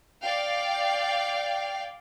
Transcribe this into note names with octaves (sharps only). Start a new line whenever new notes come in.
D5 F5 G5